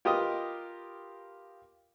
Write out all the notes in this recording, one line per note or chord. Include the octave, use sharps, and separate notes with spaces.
F4 G4 A#4 B4 D#5 D#6